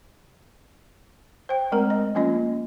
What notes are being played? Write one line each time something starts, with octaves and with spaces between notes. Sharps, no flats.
C5 G5
G#3 A3 C4 A#4 A#5
D#5
F3 A#3 C#4 F4 D#5